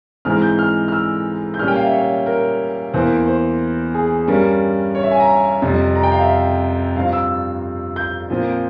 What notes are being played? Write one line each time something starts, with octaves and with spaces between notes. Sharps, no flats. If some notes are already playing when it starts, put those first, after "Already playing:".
G#2 E3 G#3 C4 F6
G6
F6
F6
E6
G6
A#2 G3 A#3 C#4 F6
G5
F5
E5
C#5
A#4
E2 E3 A#3 C5
C5
G#4
G2 G3 C#4 A#4
C#5
E5
G#5
A#5
F2 C3 G3
A#5
G5
F5
E5
G2 F3 C4 F5
E6
G6
A#2 F3 C4